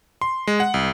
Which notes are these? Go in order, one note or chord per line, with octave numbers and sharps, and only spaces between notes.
C6
G#3
F#5
C2